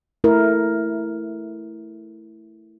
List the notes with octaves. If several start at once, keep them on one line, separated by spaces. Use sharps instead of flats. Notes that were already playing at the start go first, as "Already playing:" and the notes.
A3 E4 A#4